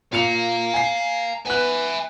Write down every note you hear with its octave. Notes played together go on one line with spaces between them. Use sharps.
A#2 F5 A#5 C#7 F7
G#5 C7
B3 E5 G#5 F#6